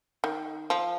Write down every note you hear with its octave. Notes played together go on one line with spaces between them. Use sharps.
D#3
F3